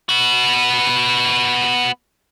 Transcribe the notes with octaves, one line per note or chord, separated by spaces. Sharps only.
B3 F#4